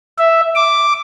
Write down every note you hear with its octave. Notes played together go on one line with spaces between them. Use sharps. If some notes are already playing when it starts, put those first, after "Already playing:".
E5
D6